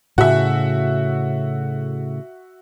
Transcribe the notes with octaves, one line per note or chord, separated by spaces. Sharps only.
A2 C#3 F#4 E5